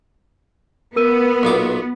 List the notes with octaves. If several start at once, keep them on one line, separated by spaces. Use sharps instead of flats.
B3 A#4 E6 D#7
B1 A#2 D6